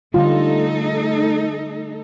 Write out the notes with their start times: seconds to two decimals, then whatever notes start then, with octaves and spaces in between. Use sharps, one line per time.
0.14 D3 G3 A3 D#4 F4 A4